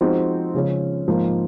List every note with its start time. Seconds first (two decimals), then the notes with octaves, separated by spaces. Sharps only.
0.01 F3 G#3 C4 D#4 F#4
0.54 C#3 F3 G#3 C#4
1.07 G#2 F3 A#3 D#4